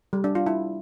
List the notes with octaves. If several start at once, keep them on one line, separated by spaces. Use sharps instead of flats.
G3
D4
F4
E4